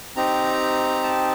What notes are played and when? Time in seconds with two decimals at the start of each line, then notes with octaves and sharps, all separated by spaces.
0.16 C4 D#4 G4 A#5
1.04 A5